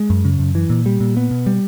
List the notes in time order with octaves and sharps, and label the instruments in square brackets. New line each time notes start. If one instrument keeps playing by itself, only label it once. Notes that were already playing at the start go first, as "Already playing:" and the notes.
Already playing: [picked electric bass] G#3
F#2
C#3
F#2
E3
A#2
G3
A#2
B3
B2
G3